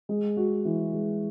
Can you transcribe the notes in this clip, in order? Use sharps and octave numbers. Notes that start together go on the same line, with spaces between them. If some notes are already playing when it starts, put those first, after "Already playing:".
G#3
F#4
E3
G#3